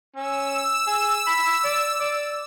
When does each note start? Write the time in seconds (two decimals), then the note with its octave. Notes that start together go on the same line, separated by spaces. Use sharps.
0.16 C#4 E6
0.87 G#4
1.27 B5
1.64 D5
2.00 D5